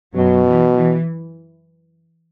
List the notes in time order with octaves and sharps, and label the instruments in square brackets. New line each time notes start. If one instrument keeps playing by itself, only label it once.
[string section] F#2 F#3 [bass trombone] B2
[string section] E3
E3